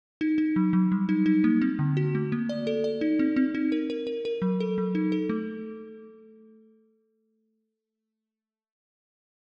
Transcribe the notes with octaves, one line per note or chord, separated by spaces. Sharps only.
D#4
D#4
F#3
F#3
G3
D#4
D#4
A#3
C4
D3
F#4
A3
A#3
D5
A4
D5
D#4
C4
C4
D#4
A#4
A#4
A#4
A#4
F#3
A4
F#3
D#4
A4
A3